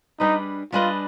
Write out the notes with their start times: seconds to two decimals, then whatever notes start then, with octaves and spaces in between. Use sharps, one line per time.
0.20 G3 D4 D#4 G#4 B4 D#5
0.72 G3 D4 F4 G#4 B4 D#5